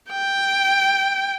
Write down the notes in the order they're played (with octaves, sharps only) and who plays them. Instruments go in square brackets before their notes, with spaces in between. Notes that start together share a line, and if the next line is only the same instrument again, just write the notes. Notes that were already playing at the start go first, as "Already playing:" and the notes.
[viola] G5